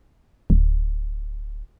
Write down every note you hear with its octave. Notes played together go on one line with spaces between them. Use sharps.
D1